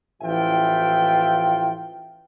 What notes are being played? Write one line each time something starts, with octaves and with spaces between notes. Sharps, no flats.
A1 E3 F3 F4 E5 G5